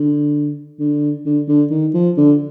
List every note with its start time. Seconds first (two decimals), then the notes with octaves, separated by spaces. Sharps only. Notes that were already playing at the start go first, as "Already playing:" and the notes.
Already playing: D3
0.79 D3
1.26 D3
1.48 D3
1.71 D#3
1.94 F3
2.17 D3